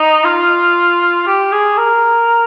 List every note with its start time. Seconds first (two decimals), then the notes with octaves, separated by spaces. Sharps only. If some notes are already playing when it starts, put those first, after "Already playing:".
Already playing: D#4
0.25 F4
1.27 G4
1.52 G#4
1.78 A#4